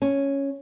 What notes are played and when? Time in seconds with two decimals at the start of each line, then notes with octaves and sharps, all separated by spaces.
0.02 C#4